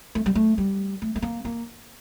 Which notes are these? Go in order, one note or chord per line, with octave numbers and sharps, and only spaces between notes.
A3
G3
A3
G3
A3
A3
A#3
A#3